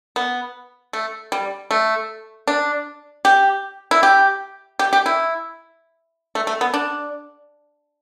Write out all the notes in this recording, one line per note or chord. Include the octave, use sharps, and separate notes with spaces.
B3
A3
G3
A3
D4
G4
E4
G4
G4
G4
E4
A3
A3
B3
D4